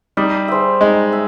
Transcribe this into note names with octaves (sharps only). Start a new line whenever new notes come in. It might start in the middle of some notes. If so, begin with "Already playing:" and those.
G3 D#4
G#4 C5 E5
G#3 D#4
E5